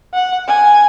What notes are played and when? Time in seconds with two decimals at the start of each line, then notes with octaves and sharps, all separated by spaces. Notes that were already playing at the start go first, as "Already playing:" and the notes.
0.14 F#5
0.48 G#5